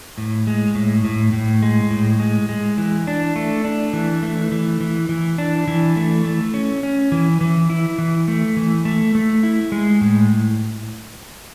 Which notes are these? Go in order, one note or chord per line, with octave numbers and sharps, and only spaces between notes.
A2
G#3
A2
A2
A2
G#3
A2
G#3
G#3
E3
D4
A3
D4
E3
A3
E3
E3
E3
D4
E3
A3
A3
C#4
C#4
E3
E3
E4
E3
A3
E3
A3
A3
E4
G#3
A2